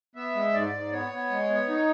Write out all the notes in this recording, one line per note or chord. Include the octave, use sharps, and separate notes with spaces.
B3 E5
G#3
G#2 D5
G#2
B3 C#5
B3
G#3
B3
D#4